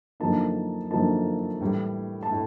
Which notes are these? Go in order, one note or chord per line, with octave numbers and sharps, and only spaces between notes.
F#2 D3 F3 A#3 D#4 A5
F#2 D3 F3 A#3 D#4 A5
A2 E3 G3
A5
A2